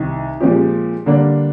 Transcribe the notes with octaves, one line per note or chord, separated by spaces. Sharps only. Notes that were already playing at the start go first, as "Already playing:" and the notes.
Already playing: C2 C3 D#3
A#2 F3 G#3 C4 G4
D3 G3 A#3 D4